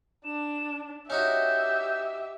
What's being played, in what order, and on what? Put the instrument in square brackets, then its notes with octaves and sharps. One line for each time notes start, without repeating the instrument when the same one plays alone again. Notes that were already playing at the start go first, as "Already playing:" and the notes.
[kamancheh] D4 [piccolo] E7
[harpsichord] C#4 D#4 F#4 [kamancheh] G4 E5 [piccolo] G6